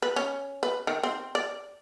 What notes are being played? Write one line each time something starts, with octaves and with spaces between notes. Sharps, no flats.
B4
C#4
B4
D#3
C4
D5